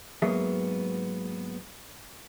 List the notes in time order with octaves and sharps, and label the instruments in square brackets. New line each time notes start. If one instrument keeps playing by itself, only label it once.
[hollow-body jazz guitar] G#2 F#3 A#3 B3 G#4 E5